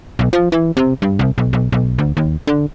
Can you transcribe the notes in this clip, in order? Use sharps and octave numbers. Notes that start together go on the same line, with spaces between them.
B1
F3
E3
C3
G2
C2
B1
B1
B1
D2
D#2
D3